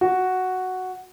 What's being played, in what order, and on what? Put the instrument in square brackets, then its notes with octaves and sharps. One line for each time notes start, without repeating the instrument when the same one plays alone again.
[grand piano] F#4